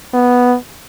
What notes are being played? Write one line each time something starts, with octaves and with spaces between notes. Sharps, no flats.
B3